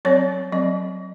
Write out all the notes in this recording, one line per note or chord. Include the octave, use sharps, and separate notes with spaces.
F#3 C4 C#5
F#3 C4 D#5